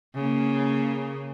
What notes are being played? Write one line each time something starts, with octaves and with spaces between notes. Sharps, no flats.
C#3 A#3